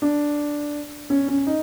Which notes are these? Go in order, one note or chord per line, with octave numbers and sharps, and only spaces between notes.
D4
C#4
C#4
D#4